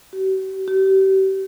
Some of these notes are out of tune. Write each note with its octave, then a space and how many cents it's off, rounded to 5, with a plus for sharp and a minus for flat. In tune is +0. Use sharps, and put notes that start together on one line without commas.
G4 -45
G4 -35